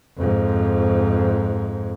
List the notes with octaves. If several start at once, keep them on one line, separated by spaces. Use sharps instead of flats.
F2 G#2